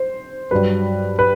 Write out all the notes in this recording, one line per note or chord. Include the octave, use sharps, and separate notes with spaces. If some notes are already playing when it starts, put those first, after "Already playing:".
Already playing: C5
G2 F#3 B4
B4